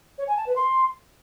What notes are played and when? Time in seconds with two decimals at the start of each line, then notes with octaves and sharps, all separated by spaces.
0.18 C#5
0.27 G#5
0.37 A5
0.46 B4
0.56 C6